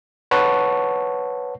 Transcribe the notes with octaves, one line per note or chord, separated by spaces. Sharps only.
B4 C#5 F#5 A5 C#6